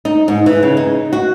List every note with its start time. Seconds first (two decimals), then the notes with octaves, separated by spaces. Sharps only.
0.05 D#4
0.28 G#2
0.46 E3
0.63 C#3
0.77 D#4
1.13 F#4